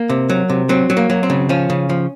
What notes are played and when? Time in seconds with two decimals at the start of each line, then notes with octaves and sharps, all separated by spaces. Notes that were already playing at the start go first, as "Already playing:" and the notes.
Already playing: A#3
0.09 C3
0.29 F#3
0.49 C3
0.69 F#3 C4
0.90 F#3
0.97 A#3
1.10 F#3
1.23 C4
1.30 C#3
1.49 F3 C#4
1.70 C#3
1.89 F3